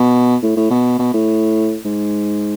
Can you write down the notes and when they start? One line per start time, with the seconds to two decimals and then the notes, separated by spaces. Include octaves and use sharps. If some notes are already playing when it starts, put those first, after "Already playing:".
Already playing: B2
0.42 A2
0.57 A2
0.70 B2
0.99 B2
1.14 A2
1.85 G#2